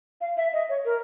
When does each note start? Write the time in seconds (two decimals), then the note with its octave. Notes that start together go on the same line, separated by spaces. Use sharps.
0.21 F5
0.37 E5
0.53 D#5
0.69 C#5
0.85 A#4